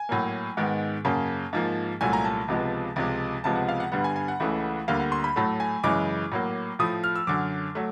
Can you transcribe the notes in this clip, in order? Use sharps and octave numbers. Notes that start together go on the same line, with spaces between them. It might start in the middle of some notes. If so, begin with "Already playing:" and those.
Already playing: G#5
A2 F#3 A#3
G#2 D#3 G#3 B3
F#2 C#3 F#3 A#3 A5
G#2 F3 A#3
C2 A#2 F#3 A3 G#5
A#5
A5
C#2 C3 F3 G#3 B3
C#2 C3 F3 G#3
C#2 C3 F3 G#3 B3 A5
F#5
F5
F#5
G2 D3 G3 B3 F#5
G#5
G#5
F#5
C#2 C#3 E3 A3
D2 D3 G3 A#3 F5
F#5
C6
B5
A2 F#3 A3 A5
G#5
F#2 C#3 E3 G#3 D6
A2 F#3 A#3
A2 F3 A3 D#6
F6
E6
F#2 D3 F#3 D6
F#3 A3